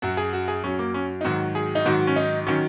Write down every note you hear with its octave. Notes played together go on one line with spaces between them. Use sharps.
F#2 F#3 F#4
G#4
F#4
G#4
F#2 F#3 C#4
A#3
C#4
D#4
G#2 D#3 F#3 F#4
G#4
D#4
G#2 D#3 F#3 F#4
C#4
D#4
D#3 F#3 C#4